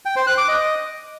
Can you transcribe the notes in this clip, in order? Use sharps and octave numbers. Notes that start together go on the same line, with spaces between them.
G5
C5
F#6
D6
D#5